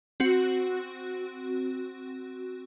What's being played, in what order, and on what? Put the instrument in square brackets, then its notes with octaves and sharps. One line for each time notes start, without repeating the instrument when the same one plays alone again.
[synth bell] C4 F#4